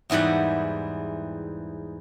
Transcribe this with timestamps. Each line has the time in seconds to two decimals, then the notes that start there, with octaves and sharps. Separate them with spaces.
0.10 E2 G#2 E3 G3 F#5